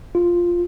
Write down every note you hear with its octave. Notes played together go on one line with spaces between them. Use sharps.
F4